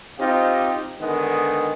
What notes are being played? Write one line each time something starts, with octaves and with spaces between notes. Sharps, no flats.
C4 D#4 F4 G4
D3 D#3 G#3 B3